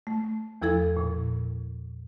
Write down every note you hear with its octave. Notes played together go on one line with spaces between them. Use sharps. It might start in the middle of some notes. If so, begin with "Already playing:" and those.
A3
E2 F3 E4 A4 G#6
A#2